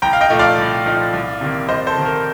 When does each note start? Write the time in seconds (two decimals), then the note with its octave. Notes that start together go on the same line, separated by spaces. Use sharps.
0.02 C2 G5 A#5
0.13 F5
0.21 D#5 G5
0.30 A#2 F3 A3 D#4
0.39 D5 F5
0.58 C2
0.86 A#2 F3 A3 D#4
1.13 C2
1.41 C3 D#3 A#3
1.68 C2 C5 D#5
1.86 A4 C5
1.97 C3 D#3 A#3
2.06 A#4